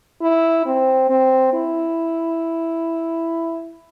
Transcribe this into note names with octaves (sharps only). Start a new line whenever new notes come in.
E4
C4
C4
E4